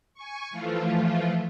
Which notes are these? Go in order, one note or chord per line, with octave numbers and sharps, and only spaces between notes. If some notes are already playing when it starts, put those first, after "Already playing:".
G#5 C#6
E3 F3 A3 F4